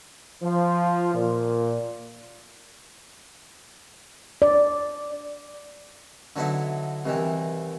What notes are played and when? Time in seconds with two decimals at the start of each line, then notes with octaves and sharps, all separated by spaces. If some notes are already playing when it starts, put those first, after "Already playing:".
0.42 F3
1.14 A#2
4.42 D5
6.36 D3 F#3 B3 D#4 E4
7.05 C2 D#3 E3